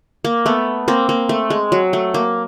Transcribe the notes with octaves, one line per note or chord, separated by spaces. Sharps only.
A#3
A3 B3
A#3 C4
A#3
A3
G#3
F#3
A3
A#3